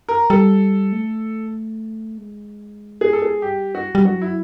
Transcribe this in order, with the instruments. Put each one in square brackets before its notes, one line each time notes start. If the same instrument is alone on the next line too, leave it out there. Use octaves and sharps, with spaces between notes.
[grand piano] A#4
[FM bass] G3 [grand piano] A4
[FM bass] A3
G#3
[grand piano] G#4
A4
G#4
[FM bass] G3 [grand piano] G4
[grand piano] F#4
[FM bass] G3
[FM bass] F#3 [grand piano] F#4
[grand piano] E4